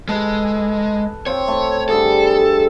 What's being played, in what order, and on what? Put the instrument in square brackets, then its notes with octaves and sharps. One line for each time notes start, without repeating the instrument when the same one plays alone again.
[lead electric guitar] G#3 [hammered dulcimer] A4 B4
[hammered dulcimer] C4 F4 [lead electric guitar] C#5
[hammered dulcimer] A3 E4
[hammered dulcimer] D3 G3 G#4 [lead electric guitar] A4